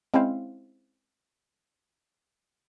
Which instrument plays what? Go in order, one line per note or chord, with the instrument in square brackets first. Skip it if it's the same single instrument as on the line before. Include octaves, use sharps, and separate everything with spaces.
[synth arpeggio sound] G#3 C4 C#4 E4 C5 F5